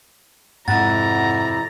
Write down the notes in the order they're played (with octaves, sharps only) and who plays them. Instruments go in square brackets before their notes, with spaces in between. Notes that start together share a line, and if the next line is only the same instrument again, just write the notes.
[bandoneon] F2 C3 E4 [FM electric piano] G#2 F#5 [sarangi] A#5 [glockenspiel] A6